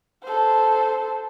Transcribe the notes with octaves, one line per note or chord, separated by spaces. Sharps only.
A4 C5